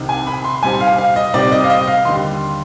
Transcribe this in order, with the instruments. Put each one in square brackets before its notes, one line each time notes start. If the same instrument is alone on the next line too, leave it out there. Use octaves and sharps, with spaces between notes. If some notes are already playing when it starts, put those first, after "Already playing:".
Already playing: [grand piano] C2 C3 D#3
G#5
B5
C6
C3 G3 C4 D#4 G#5
F5
F5
D#5
C3 G3 C4 D#4 D5
D#5
F5
D#5
F5
D#2 D3 G3 C6